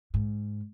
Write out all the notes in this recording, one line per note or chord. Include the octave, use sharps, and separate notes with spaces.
G#2